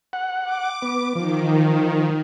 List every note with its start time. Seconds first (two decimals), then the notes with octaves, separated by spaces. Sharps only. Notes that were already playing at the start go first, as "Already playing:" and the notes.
0.13 F#5
0.43 D6
0.82 B3
1.15 D#3 F3